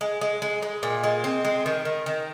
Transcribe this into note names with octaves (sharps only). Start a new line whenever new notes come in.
G#3
G#3
G#3
G#3
A#2
G#3
C4
G#3
D#3
D#3
D#3